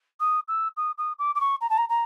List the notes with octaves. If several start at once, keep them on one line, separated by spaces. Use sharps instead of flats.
D#6
E6
D#6
D#6
D6
D6
C#6
A#5
A5
A#5
A#5